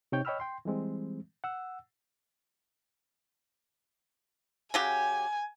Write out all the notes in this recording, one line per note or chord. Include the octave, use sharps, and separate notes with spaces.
C3 D#4 C#5 G5 G6
C#5 D#5 G5 B5 E6 F6
G5 C6
E3 G3 G#3 C4
F#5 E6
C#3 F#3 G4 G#5